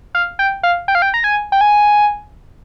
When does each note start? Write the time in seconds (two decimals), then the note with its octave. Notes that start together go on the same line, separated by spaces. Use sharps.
0.15 F5
0.39 G5
0.63 F5
0.88 G5
0.95 F5
1.02 G5
1.14 A#5
1.24 G#5
1.52 G5
1.61 G#5